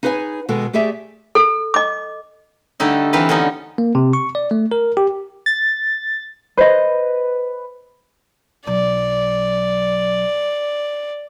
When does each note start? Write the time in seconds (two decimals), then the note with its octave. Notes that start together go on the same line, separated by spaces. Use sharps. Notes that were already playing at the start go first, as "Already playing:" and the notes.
0.03 D#4 G#4 B4 C#5 F#5 G#5
0.49 B2 D#3 G#3 A4
0.73 A3 G4 G#4 D5 E5
1.35 A4
1.74 D#5 D6
2.80 D3 G3 A3 D#4
3.13 E3 C4 D#4 B4 F5
3.29 D3 B3 C#4 D#4
3.78 A#3
3.95 C3
4.13 C#6
4.35 D5
4.51 A3
4.72 A#4
4.97 G4
5.46 A6
6.57 B4 C5 D#5
8.67 B1 F#3 D5